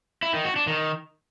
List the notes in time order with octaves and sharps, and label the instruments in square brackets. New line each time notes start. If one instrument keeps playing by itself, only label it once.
[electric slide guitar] E4
D#3
F#4
D4
D#3